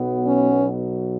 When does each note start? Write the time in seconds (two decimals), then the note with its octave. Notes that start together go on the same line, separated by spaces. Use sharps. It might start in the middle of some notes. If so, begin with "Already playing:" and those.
Already playing: B1 B2 F#3 B3
0.24 C#4